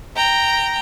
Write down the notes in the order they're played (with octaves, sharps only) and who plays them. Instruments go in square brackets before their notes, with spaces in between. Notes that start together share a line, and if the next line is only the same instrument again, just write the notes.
[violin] G5 A#5